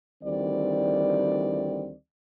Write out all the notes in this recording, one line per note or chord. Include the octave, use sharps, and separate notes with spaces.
D2 D#3 E3 G3 C4 D5